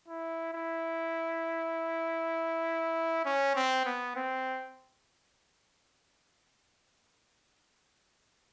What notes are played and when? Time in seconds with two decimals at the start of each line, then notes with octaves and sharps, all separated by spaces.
0.08 E4
0.54 E4
3.25 C#4
3.56 C4
3.86 B3
4.16 C4